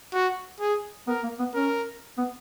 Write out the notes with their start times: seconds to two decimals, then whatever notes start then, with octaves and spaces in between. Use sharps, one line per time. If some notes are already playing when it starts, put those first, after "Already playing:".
0.14 F#4
0.60 G#4
1.07 B3 A#4
1.24 A#3
1.39 B3
1.54 C#4 A#4
2.18 B3